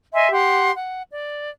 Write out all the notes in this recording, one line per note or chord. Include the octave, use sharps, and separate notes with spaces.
D#5 E5 G#5 C6
G4 F#5 C6
F#5
D5